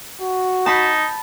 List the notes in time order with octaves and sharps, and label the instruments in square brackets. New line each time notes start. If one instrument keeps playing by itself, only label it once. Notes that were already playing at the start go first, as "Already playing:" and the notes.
[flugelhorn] F#4
[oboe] D#4 [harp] A5 B5